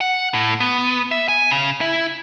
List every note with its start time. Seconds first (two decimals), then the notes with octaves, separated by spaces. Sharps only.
0.01 F#5
0.34 A2
0.60 B3
1.11 E5
1.28 G#5
1.50 C#3
1.81 E4